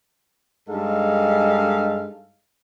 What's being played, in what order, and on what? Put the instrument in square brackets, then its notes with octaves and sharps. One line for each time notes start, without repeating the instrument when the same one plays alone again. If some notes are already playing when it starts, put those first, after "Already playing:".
[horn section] G2 G#3 D#4 A4 F5